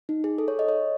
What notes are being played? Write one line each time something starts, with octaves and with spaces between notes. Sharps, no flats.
D#4
G#4
A4
C#5
D#5
C#5